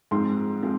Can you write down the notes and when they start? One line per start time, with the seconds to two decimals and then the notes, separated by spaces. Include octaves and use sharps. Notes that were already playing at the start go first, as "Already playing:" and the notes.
0.11 G#2 F3 G#3 C4 C6
0.62 F3 G#3 C4